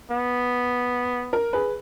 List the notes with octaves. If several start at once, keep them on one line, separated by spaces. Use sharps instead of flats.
B3
A#4
G#4 B4